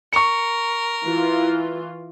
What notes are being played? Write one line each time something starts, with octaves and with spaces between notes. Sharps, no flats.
A#4 C#6 C#7
E3 F4